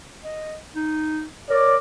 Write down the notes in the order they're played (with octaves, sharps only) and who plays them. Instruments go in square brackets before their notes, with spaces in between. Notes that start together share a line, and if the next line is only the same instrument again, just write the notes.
[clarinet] D#5
D#4
[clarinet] A#4 [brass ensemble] C#5 D5